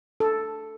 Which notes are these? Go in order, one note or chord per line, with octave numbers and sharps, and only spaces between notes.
A4